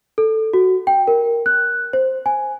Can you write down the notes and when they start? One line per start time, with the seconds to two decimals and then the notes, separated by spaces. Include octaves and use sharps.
0.18 A4
0.54 F#4
0.87 G5
1.07 A#4
1.46 F#6
1.93 C5
2.26 G#5